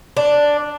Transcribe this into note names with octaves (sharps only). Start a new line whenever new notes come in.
D4